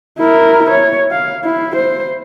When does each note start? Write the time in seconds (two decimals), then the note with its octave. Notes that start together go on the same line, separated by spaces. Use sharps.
0.19 E4 A#4
0.71 C#5
1.11 F5
1.44 E4
1.76 C5